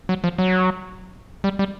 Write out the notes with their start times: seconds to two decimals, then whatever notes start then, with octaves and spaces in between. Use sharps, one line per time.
0.09 F#3
0.24 F3
0.38 F#3
1.44 G3
1.59 G3